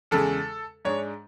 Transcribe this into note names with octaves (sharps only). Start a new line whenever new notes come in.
E2 C#3 G#3 A4
G#2 G#3 D4 C#5